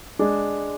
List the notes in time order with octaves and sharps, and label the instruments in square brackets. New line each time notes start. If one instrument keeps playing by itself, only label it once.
[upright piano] G#3 D4